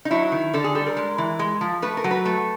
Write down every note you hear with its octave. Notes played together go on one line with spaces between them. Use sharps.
D#4
F#3 E4
D#3
D3 A4
G#4
G3 A4
A#4
G#3
E3
G#3
F3
A3 B4
A#4
F#3
B4
A3